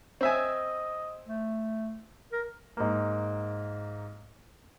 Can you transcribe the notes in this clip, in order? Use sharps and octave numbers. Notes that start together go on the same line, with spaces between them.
C4 D#5 E5 G#5
A3
A#4
G#2 A#3